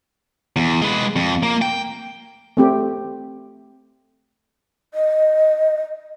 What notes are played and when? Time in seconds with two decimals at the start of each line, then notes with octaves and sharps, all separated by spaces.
0.56 E2
0.82 G#3 B4
1.16 F2
1.43 A#3
1.62 G5
2.57 A3 C4 G4
4.94 D#5